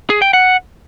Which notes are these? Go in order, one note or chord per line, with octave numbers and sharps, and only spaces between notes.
G#4
G5
F#5